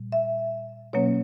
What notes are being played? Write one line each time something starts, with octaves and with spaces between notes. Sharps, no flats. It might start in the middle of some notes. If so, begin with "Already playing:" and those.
Already playing: A#2 G3
E5
B2 F#3 A#3 C#4 C#5